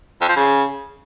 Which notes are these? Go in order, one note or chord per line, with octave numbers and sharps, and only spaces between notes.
F2
F3
C#3